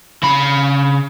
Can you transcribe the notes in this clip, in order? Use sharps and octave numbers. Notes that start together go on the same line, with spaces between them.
C#3 B5